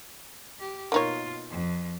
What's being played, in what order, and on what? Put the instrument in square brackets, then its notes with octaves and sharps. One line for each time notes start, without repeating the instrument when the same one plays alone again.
[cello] G4
[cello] B2 F4 [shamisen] A#3 D#4 C#5
[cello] F2